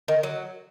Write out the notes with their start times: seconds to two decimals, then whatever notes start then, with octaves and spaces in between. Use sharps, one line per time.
0.08 D#3
0.23 F#3